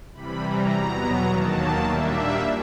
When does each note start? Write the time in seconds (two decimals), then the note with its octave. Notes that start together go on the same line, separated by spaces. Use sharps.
0.13 C3 E3 G3 B5
0.42 A#5
0.70 E2 B2 F#3 B3
1.26 D#2 D#3 F#3 A#3 A5
1.82 A#2 G3 A#3 D4 E5